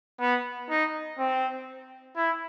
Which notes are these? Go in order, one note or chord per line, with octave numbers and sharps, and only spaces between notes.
B3
D#4
C4
E4